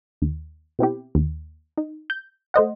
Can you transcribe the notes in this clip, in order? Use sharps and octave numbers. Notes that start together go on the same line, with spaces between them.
D#2
B2 C4 E4 G4
D#2
D#4
G6
A3 C5 D#5 F#5